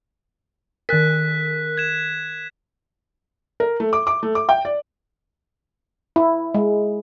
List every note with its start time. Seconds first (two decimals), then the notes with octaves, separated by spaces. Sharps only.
0.89 D#3 A#4 F#6 B6
1.77 G#6 E7
3.60 A#4
3.80 A3
3.93 D6
4.07 D6
4.23 A3
4.35 D6
4.49 G5
4.65 D5
6.16 E4
6.54 G#3